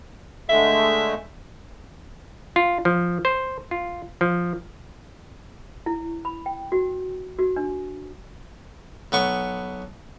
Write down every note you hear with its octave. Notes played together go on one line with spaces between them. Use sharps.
D3 G#3 A3 E5
F4
F3
C5
F4
F3
E4
B5
G5
F#4
F#4
D4
B1 B3 C#6